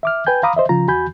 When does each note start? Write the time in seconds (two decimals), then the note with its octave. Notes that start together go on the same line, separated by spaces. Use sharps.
0.03 E5 D6 F6
0.27 B4 G5 G#5 G6
0.43 F5 A#5 B5 D6 D#6
0.56 C5 D#5 E5
0.69 C#3 F3 F4 A#5
0.88 E2 F#4 G#5 B5 G6